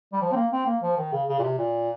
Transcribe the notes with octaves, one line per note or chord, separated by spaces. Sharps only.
G3
F3
C4
A#3
C4
A#3
F3
D#3
C#3
C#3
A#2
C3
A#2